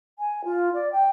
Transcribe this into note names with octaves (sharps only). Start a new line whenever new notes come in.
G#5
F4
D5
G5